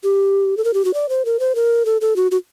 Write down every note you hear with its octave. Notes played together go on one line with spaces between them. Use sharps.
G4
A4
A#4
G4
F#4
D5
C5
A#4
C5
A#4
A4
A4
F#4
F#4